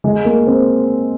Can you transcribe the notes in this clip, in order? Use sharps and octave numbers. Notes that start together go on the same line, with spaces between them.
G#3
A#3
C4